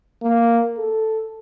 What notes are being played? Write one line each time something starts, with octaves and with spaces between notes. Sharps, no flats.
A#3
A4